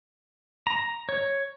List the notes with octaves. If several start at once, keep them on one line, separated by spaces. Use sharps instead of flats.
A#5
C#5